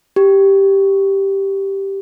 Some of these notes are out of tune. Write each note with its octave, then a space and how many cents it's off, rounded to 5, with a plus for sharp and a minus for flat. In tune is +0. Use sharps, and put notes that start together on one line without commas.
G4 -5